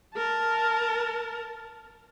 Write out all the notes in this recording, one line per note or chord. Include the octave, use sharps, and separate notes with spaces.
A#4 A5